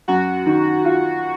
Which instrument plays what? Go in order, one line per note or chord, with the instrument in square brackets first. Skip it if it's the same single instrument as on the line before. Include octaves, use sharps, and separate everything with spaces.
[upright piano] F#2 [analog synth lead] F#4
[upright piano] D#3
F4